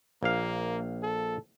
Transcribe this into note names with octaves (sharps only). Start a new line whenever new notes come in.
A#1 A#3 F5
A4